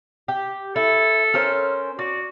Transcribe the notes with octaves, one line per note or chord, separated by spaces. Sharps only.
G4
E4 A4
C#4 A#4 C5
F#4 D5